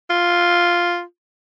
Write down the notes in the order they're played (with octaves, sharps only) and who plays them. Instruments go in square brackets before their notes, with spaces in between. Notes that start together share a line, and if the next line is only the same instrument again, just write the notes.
[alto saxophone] F4